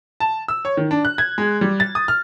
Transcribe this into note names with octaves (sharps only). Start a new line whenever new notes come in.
A5
E6
C#5
D#3
D4
F#6
G#6
G#3
G3
A6
D#6
F6